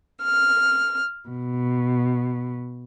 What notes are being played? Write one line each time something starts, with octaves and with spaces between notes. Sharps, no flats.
F6
B2